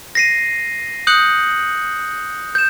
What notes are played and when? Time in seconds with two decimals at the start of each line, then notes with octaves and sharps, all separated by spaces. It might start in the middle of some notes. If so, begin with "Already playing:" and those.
0.15 A#6 C7 D#7
1.07 D#6 F#6 G6 C#7 F#7
2.55 G6 E7